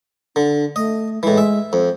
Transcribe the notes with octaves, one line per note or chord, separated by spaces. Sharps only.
D3 D4
A3 D#5
A2 E3 G#3
E5
F2 C5